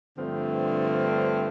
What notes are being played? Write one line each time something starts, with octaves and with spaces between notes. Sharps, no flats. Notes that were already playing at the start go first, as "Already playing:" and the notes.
G2 D3 F3 A3 C4